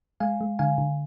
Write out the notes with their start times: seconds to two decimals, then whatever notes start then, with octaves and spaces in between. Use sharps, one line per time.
0.20 G#3 F5 G#5
0.41 G#3
0.59 D3 F5 G#5
0.78 D3